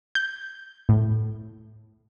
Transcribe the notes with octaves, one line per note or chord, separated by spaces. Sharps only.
G6
A2